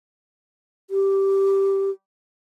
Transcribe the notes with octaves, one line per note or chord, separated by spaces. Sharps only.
G4